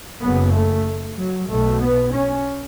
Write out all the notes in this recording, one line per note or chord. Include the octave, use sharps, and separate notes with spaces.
F#1 F#2 C#3 B3
A3
F#3
B1 B2 A3
B3
C#4